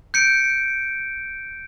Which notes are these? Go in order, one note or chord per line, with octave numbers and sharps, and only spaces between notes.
G6 C#7 D7